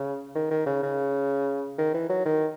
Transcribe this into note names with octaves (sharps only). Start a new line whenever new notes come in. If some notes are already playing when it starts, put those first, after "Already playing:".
Already playing: C#3
D#3
D#3
C#3
C#3
D#3
E3
F#3
D#3